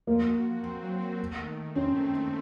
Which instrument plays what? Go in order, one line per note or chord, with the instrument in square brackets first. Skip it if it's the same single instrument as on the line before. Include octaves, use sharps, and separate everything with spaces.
[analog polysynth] F3 [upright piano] A#3
[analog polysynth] F#4
F#4
C4
F#3
C4
A3
D#3
D#3
[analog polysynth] C4 [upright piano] C#4
[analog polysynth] A3
C4